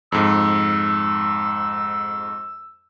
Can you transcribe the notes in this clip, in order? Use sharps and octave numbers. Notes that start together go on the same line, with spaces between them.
F2 G#2 E6